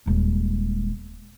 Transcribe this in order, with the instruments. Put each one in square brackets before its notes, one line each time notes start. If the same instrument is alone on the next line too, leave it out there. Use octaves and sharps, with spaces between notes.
[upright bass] D#1 G#3